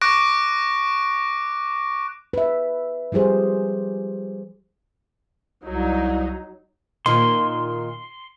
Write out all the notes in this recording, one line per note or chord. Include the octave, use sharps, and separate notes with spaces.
C#6 D6 F#6 A#6 D7
B4 E5
F3 G3 G4 G#4 C5
C2 F#3 D#4
A#2 D#3 C6